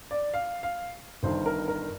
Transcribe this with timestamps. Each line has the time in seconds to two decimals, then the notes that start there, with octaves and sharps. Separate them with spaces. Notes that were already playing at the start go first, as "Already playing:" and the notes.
0.11 D5
0.34 F5
0.63 F5
1.23 G1 G2 D#3 C5
1.46 A#4
1.68 A#4